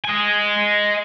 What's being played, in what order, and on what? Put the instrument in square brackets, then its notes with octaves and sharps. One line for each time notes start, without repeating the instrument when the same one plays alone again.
[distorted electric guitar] D#5 G#5